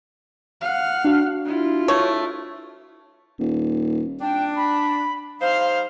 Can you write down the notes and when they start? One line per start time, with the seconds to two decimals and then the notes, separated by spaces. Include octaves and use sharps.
0.61 F5 F#5
1.04 D4 F#4
1.45 E4 F4
1.88 A3 C#5
3.39 D#1
4.21 D4 G5
4.56 B5
5.41 G3 D#4 C5 F5